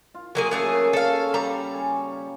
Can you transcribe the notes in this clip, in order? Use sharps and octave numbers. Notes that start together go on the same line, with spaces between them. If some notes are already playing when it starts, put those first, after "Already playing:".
F4
F#3 A#3 G#4
C#3 F#3 A3 A#3 G#4
A4 C#5 F5
G3 A#5
G#5 C#6